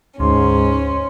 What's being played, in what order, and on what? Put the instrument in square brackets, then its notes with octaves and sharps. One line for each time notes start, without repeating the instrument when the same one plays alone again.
[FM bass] D2 [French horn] G#2 [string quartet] C#4 [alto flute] C6